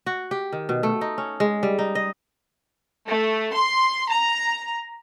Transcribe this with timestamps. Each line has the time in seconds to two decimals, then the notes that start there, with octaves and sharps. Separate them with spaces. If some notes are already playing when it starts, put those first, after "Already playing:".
0.06 F#4
0.31 G4
0.52 D#3
0.69 B2
0.83 A3
1.01 D#4
1.18 C#4
1.40 G#3
1.63 G3
1.79 D#4
1.95 D#5
3.06 A3
3.53 C6
4.08 A#5